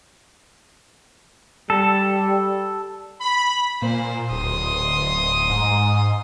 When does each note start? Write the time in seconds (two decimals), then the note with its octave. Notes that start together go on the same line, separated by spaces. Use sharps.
1.70 G3 A4
3.21 B5
3.82 A#2 C5
4.31 D1 C6 D#6
5.50 G#2